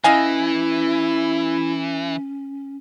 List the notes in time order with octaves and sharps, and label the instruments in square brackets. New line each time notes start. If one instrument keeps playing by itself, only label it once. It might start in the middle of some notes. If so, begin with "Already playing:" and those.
[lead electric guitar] E3 [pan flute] C#4 [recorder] E4 [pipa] D#5 F5 G#5